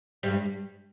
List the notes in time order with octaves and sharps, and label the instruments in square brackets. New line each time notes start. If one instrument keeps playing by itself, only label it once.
[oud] G2 G3